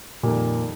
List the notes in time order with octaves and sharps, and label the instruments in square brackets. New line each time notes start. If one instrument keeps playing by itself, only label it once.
[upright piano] F2 D#3 G3 [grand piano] A#2